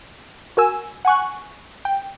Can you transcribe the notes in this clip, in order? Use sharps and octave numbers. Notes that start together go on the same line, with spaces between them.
F#4 A#4 G#5 E6
F#5 G#5 C#6 F#6
G5